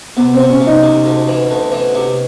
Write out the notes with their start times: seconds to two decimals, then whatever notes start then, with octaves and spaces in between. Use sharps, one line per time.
0.17 C3 B3
0.34 C4
0.39 C3
0.50 C#4
0.61 C3
0.67 D#4
0.83 C3
1.06 D2
1.28 E3
1.50 D2
1.72 E3
1.95 C3